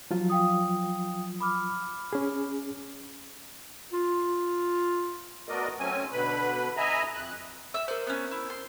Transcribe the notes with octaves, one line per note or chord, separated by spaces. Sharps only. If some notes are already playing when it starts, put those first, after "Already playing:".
F3 F#3 F4
F5 G5 D#6
B5 D6 F6
C#4 G#4
F4
A3 B3 F#4 A#4 D5 D#5
F#3 A3 C4 C#4 G#5
B2 D3 B4 B5
D#5 E5 G#5 A#5 B5
F2 F#6
E5 E6
A#4 C5 D5
B3 C#4
E4
C6